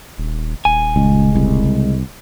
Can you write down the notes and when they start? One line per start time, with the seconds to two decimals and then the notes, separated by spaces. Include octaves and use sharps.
0.18 D#1
0.65 D#1 G#5
0.96 C#2 C#3 G#3
1.35 C2